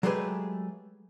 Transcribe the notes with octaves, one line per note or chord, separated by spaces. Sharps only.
F#3 G#3 A3 G4 G#4 B4